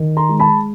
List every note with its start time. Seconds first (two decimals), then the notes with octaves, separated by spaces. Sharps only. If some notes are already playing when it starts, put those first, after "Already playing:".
Already playing: D#3
0.17 A#5 C6
0.29 G#3
0.40 A5 B5